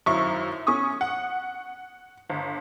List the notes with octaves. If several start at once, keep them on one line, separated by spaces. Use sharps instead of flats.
G#1 F#2 E4 C#6
C#4 C#6 D#6
F#5
G1